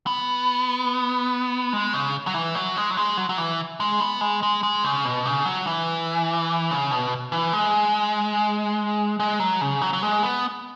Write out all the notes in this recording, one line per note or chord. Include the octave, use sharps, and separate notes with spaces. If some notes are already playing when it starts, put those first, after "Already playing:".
B3
G#3
C#3
F#3
E3
F#3
G#3
F#3
G#3
F#3
F#3
E3
G#3
B3
G#3
G#3
G#3
C#3
B2
C#3
F#3
E3
C#3
B2
E3
G#3
G#3
F#3
C#3
F#3
F#3
G#3
B3